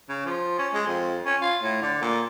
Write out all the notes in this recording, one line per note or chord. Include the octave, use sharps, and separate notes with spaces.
C#3
F3
C#4
G#3
F2
C#4
F4
A2
D3
A#2